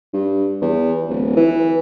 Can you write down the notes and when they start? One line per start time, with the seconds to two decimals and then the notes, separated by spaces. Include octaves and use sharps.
0.14 G2
0.62 E2
1.09 D1
1.37 E3